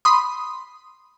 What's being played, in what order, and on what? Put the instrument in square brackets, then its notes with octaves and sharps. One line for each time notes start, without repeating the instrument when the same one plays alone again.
[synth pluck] B5 C6 D#6